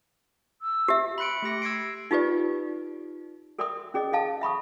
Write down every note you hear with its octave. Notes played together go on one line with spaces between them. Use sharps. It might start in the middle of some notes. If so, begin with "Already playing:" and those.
E6
G4 E5
B5 C6 F#6 C#7 D7
A3 G4 A#6 C#7
E6 G#6 A#6 C7 D7
D#4 F4 G4 B4 D5
A4 A#4 D5 E5 C6 D#6
C#4 G#4 D5 D#5
A4 D#5 F5 A5
E5 B5 C#6 D#6